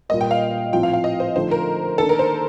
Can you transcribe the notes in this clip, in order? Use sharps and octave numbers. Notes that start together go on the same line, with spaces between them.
A#2 G3 A#3 D#5
G5
F5
A2 F3 C4 F4 G5
F5
F5
D#5
C5
D3 F3 A3 D#4 C5
A#4
D#3 A#3 D4 A4
A#4
C5